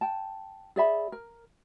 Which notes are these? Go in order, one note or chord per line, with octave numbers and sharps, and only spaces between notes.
G5 A5
G#4 D5 E5 B5
A#4